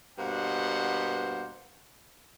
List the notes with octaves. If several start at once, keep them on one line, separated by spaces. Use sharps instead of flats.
G2 B2 A#3 C5 F#5